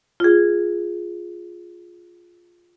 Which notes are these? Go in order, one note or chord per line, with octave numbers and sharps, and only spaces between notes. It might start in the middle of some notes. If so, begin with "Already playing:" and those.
F4 G#4